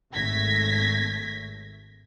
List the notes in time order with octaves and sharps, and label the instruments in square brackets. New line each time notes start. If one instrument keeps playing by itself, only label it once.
[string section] G#1 A3 G#6 A#6 B6